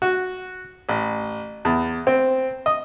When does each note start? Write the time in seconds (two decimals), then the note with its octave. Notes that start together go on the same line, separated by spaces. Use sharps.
0.02 F#4
0.89 A1
1.65 E2
2.07 C4
2.66 D#5